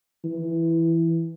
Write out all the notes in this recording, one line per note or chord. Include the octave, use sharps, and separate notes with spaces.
E3